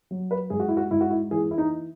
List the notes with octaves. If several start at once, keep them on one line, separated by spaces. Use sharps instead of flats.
F#3
B4
G#2 G#4
F#4
E4
F#4
G#2 E4
F#4
E4
E3 G#4
E4
D#4